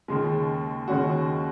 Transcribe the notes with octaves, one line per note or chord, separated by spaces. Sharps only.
D#2 C#3 G#3
D#2 C#3 G#3 C#4 F#4